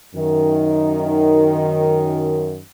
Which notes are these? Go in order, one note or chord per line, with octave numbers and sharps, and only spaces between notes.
F#2 D#3